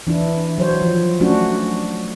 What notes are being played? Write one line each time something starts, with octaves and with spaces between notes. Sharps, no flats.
E3 D4 E4
F#3 C5 C#5
F3
F#3 A3 C#4 D4 F#4